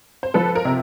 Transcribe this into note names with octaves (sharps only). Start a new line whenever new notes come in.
C5
F3 A4 B4
A#4
C3